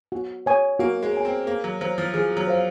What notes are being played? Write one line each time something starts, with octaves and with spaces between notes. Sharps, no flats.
F#4
C#5 G#5
A#3 F#4
G#3
C#5 G#5
C4
A#3 G#4
F#3
F#3 C5 F5
F3
F3 G#4
F#3
C5 F5